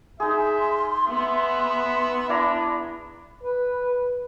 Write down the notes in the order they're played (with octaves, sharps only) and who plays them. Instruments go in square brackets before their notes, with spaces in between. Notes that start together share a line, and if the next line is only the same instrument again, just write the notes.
[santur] D#4 G#4 [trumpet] E5 [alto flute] C6
[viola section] B3 [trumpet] E5
[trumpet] D4 [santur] E4 D5 A#5
[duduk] B4